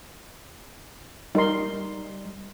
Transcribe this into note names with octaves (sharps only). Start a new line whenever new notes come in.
G3 D#4 A#4 C6